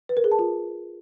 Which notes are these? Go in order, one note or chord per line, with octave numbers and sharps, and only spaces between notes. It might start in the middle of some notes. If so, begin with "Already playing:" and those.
B4
A#4
G#4
A5
F4